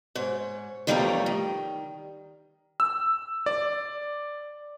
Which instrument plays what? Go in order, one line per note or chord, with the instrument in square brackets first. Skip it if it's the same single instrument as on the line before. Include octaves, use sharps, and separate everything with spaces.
[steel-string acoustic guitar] G#2 C#5
E2 F3 G3 A3 A#3 C#5
D#3
[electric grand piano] E6
D5